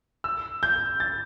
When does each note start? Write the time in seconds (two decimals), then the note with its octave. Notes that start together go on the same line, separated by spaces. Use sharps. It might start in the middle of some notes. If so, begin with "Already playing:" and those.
0.24 E6
0.63 G6
1.00 A6